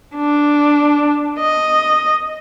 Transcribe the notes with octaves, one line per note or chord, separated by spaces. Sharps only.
D4
D#5